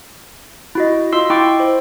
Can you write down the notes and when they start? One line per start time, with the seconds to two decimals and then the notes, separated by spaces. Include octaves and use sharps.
0.75 E4 F#4 D#5
1.12 F4 D#5 C6 E6 C7
1.30 E4 G5 C#6 D6 E6
1.60 C5